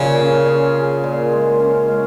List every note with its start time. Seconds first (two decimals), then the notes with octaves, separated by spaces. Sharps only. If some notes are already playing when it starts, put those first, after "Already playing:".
Already playing: A#2 C#3
0.19 C#4
0.47 G#4
0.76 G#4
1.04 A#2
1.32 G#3
1.60 C#4
1.88 G#3